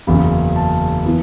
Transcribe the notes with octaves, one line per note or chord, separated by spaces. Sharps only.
F#1 E2 C#3 B5
A5
E3 B3